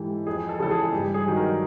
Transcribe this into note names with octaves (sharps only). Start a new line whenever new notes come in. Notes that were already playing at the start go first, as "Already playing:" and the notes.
Already playing: G#2 E3 G4 A4
F2 G#4
A4
C#3 E3 A4
G#4
G2 G4
G#4
D#3 F#3
A#4